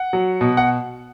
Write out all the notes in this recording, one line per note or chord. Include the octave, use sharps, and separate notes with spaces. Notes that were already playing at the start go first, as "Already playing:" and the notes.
Already playing: F#5
F#3
B2
F#5